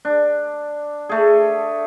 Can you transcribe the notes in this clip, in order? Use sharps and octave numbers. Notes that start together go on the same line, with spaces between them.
D4
A3 G#4